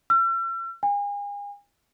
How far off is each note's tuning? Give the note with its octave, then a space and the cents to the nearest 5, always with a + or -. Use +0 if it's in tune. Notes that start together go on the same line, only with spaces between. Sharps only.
E6 +45
G#5 -40